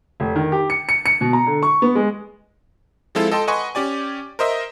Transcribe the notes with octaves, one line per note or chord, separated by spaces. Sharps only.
F1
D#3
G4
C#7
C#7
C#7
B2
A#5
D3
C#6
B3
G#3
F3 G#3 C4 E4 F4 A4
A4 D#5 G5 A5 C6
B4 D#5 F#5 G#5 C6 C#6
C#4 G4 D5 G#5
A#4 C5 D#5 E5